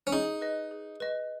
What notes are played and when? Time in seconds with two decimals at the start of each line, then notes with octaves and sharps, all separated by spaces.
0.07 C#4
0.12 D#4 G#4
0.41 B4 D#5
0.71 G#4
1.00 B4 D#5